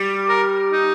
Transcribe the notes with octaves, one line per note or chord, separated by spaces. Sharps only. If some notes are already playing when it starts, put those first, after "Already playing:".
Already playing: G3
A#4
D#4